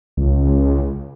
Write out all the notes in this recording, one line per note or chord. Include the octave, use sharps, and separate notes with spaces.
C#2